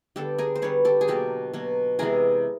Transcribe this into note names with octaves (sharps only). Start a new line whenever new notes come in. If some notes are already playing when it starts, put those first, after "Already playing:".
D3 G3 B3 G4 A4
G#4 A#4
C5
D3 G3 B3 B4 C#5
G4 A4
G#4
B2 F#3 A#3 G4 A4
B2 F#3 A#3
C3 E3 G#3 B3 G#4 A#4